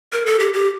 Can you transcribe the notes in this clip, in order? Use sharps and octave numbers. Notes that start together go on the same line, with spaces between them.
A#4
A4
G4
G4